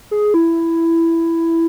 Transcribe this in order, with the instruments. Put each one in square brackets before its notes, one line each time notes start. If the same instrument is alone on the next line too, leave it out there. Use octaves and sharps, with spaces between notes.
[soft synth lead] G#4
E4